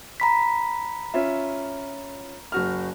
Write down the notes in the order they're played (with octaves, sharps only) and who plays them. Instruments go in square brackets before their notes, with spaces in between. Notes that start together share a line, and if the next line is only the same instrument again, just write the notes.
[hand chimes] A#5 B5 B6
[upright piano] C#4 F4 E5
F#1 F#4 F6